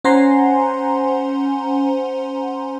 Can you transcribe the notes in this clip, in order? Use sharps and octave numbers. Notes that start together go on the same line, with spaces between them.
C#4 C5 F#5 G#5 A#5 C6